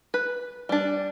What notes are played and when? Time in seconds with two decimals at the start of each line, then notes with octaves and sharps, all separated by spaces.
0.14 B4
0.69 G3 D4